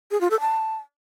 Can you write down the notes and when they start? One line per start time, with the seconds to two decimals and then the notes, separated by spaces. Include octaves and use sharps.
0.11 G#4
0.21 F4
0.31 A4
0.40 A5